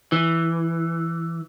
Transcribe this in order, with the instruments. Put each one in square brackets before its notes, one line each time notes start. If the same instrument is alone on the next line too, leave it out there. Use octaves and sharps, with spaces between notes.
[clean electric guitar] E3